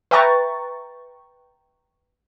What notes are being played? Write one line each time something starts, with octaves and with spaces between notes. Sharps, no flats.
B4 E5 G5 A#5 C#6 A6